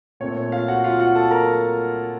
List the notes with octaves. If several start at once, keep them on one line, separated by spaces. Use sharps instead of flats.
A#2 A3 C4 C#5
C#5
F4 F5
F#4 F#5
F4 F5
F#4 F#5
A4 A5
A#4 A#5